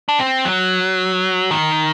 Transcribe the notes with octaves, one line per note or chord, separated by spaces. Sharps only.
D4
C4
F#3
D#3